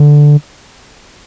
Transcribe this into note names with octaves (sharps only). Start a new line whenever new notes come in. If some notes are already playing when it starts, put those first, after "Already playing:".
Already playing: D3